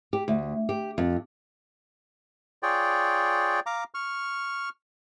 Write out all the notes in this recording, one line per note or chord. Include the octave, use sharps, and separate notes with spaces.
G4
D2
G4
F2
F4 G#4 C#5 D5 G5
F5 A#5 D6
C#6 F6